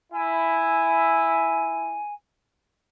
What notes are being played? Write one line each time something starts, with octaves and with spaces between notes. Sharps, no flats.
E4 G#5